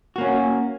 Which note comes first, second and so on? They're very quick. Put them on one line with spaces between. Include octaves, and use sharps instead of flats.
F#4 A#3 C#4